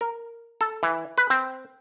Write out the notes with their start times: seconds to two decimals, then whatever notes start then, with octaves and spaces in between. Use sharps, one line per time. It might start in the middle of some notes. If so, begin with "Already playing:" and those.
0.01 A#4
0.61 A4
0.83 E3
1.18 B4
1.30 C4